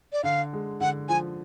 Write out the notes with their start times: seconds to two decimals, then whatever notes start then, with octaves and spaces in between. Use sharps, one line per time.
0.13 D5
0.23 D3 F5
0.53 G#3
0.81 D3 F#5
1.09 F3 G#5